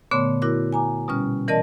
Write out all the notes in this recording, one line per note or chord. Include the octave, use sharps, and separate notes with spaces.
A#2 D3 A3 B3 C#5 C6
E4 F#4 A#4 D6
G#5 A#5 D6
B2 G3 C#4 F6
E3 A#4 D5 D#5 A5